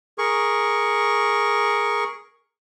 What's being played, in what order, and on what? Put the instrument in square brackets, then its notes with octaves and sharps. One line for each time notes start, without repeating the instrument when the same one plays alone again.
[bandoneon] G#4 A#4 C#6